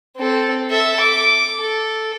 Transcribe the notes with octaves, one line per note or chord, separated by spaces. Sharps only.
C4 A4
A4 E5
D6
A4